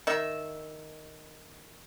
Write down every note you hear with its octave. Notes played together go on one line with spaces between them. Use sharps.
D#3 E5